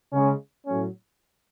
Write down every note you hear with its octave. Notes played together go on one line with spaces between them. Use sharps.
C#3 G#3 C#4
A2 F#3 A3 C#4